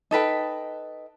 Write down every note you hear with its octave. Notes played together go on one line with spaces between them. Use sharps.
D#4 A4 B4 G5